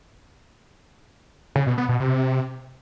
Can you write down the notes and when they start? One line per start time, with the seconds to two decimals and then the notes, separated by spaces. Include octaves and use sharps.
1.56 C#3
1.67 B2
1.78 B3
1.89 B2
2.00 C3